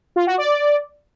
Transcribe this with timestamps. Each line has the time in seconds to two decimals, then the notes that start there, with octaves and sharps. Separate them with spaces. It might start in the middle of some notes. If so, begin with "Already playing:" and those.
0.16 F4
0.27 F#4
0.38 D5